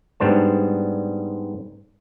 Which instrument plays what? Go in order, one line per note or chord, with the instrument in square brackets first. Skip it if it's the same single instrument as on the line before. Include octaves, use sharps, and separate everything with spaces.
[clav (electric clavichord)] G#2 G3 B3 D4 C5 A5